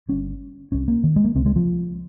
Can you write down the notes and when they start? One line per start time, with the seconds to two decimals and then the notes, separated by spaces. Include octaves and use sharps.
0.09 G1 G2 C#4
0.72 C2 C3 C#4
0.88 A#3
1.04 D#3
1.16 G#3
1.24 A#3
1.35 C#2 C3 C4
1.46 G#3
1.56 F3